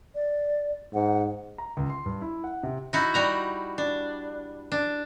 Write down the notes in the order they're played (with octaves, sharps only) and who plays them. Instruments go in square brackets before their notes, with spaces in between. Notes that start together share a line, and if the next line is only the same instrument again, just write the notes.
[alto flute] D5
[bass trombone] G#2 [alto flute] F#5
[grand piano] A#5
C#2
C6
G2
E4
F#5
C3
[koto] D#4 E4 F#4
G3 F#4 A#5
D4
D4